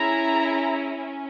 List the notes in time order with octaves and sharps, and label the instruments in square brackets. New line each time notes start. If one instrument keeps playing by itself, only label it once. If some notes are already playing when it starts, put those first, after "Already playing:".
Already playing: [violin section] C#4 E4 G#4 A#5
C#4